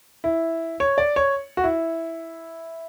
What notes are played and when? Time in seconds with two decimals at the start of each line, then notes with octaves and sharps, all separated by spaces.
0.24 E4
0.80 C#5
0.98 D5
1.16 C#5
1.57 F#4
1.64 E4